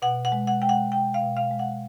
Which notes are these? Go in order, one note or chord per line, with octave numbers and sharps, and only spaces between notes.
B2 F#5
F#5
G#3
F#5
G#3 G5
F#5
B2 G5
F5
B2
F5
G#3
F#5